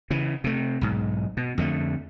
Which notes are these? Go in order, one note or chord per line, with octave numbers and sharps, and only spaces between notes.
C#3 E3
C3 A3
B1 G#2
B2
F2 D3 F3 A3